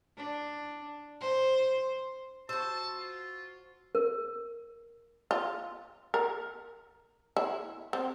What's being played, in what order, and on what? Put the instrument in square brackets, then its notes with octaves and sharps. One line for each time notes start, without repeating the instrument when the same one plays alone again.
[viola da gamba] D4
C5
[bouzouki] F#4 C5 [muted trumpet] A5 [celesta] E6
[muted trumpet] F4
[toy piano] A#4
[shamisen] F4
A#4
E4
C4